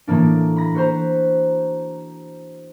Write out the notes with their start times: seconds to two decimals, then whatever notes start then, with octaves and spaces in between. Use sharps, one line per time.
0.07 A2 E3 A#3 D4
0.56 B5 A#6
0.75 F#4 B4 C5 A#5